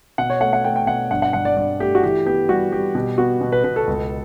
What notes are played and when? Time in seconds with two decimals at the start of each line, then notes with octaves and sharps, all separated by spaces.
0.18 B2 F#5
0.30 C#5
0.41 A3 F#5
0.53 F#5
0.64 A3 G5
0.76 G5
0.87 B2 F#5
1.11 G2 F#5
1.22 F#5
1.33 G2 F#5
1.45 D5
1.56 G2 D5
1.80 A3 G4
1.95 F#4
2.03 E3 G4
2.26 B3 G4
2.49 G3 F#4
2.72 G3 G4
2.95 B2 G4
3.18 B3 F#4
3.41 B2
3.52 B4
3.64 B2 B4
3.76 A4
3.87 C#2